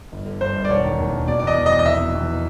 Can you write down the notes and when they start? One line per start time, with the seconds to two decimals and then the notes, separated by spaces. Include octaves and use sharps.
0.12 G1
0.26 D3
0.41 G2 C5
0.56 G1
0.65 D5
0.70 E1 C#5
0.84 D#3
0.98 D#2
1.13 E1
1.28 B2 D5
1.39 D5
1.42 E2
1.47 D#5
1.57 B2
1.66 D#5
1.71 E2
1.79 D#5
1.85 F1 E5
2.00 B2
2.15 E2